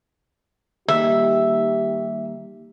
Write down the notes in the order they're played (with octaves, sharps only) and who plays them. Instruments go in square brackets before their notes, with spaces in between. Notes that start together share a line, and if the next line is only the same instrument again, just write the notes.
[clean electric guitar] D#3 G3 A#3 [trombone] G4 [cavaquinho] E5